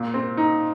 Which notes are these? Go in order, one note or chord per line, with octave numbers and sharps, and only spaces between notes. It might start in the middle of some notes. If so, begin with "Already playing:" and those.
Already playing: A#2
C4
D#4